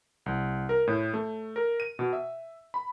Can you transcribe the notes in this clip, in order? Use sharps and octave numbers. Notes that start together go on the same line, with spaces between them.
C2
A#4
A2
A3
A#4
D#7
B2
E5
B5